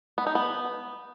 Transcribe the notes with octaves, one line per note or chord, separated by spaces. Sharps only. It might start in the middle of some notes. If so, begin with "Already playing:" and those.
B3
D#4
B3